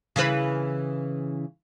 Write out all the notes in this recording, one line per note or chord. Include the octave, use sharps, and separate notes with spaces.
C#3 E3 B4